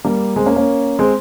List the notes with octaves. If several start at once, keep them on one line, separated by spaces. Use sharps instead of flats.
G3 A#3
G#3 C4
A#3 C#4
A#3 C#4
G#3 C4